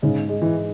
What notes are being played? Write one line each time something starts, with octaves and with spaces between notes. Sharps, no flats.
G#2 C#3
G#3
E3